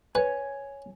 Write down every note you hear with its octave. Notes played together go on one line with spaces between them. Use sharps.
B4 C#5 G#5